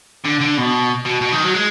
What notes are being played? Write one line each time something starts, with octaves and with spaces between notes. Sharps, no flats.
D3
D3
B2
B2
B2
D#3
F#3
G#3